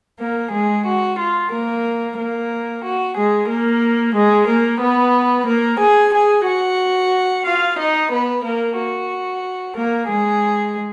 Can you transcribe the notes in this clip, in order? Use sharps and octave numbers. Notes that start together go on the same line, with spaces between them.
A#3 A#4
G#3 G#4
F#4
F4
A#3 A#4
A#3 A#4
F#4
G#3 G#4
A#3 A#4
G#3 G#4
A#3 A#4
B3 B4
A#3 A#4
G#4 G#5
G#4 G#5
F#4 F#5
F4 F5
D#4 D#5
B3 B4
A#3 A#4
F#4
A#3 A#4
G#3 G#4